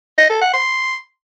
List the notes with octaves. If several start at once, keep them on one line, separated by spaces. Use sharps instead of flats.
D#5
A4
F#5
C6